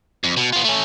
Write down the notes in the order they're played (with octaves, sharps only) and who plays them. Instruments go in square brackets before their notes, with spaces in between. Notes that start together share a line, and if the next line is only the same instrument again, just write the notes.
[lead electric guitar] F2
B2
B3 F4
A3 C#4